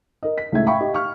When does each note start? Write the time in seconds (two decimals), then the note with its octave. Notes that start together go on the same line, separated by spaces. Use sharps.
0.23 A#4 D#5
0.38 B6
0.52 C#2 A2 A3 E5 G#6
0.66 E5 F5 G5 B5 C#6
0.80 G4 D#5
0.93 F5 C#6 F6